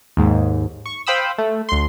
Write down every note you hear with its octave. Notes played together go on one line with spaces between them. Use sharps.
D#2 G#2
C#6
C5 F5 G5 B5 D#6 E6
A3
D2 C6